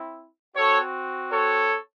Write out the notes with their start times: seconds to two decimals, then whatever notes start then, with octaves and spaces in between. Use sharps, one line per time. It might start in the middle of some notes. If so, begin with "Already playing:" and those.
Already playing: C4 E4
0.56 C4 F#4 A4 C#5
1.31 A4 C#5